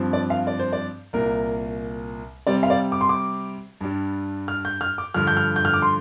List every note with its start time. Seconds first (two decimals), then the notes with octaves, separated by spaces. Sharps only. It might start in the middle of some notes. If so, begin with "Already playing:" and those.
Already playing: G2 F3 C4
0.13 D5
0.30 F5
0.47 D5
0.59 C5
0.73 D5
1.13 C2 A#2 A#3 A#4
2.47 C3 G3 C4 D5
2.63 F5
2.70 D5
2.92 D6
3.01 C6
3.09 D6
3.81 G2 G3 D4
4.48 F6
4.65 G6
4.81 F6
4.98 D6
5.14 G2 D3 F3 F6
5.27 G6
5.37 F6
5.56 G6
5.65 F6
5.74 D6
5.82 C6